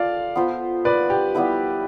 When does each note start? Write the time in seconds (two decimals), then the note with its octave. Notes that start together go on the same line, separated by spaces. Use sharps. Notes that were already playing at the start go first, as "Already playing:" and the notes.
Already playing: F4 A4 D5 F5
0.36 B3 F4 C5
0.85 B4 D5
1.10 G4
1.35 G3 B3 E4 B4